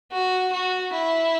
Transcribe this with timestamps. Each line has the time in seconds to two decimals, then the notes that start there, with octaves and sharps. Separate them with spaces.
0.12 F#4
0.53 F#4
0.94 E4